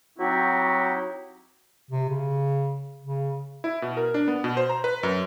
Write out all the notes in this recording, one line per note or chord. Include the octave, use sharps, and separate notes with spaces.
F#3 C4 D#4 E4 F#4 G4
C3
C#3
C#3
E4
B2
A#4
D4
B3
B2
C5
A#5
B4
F#2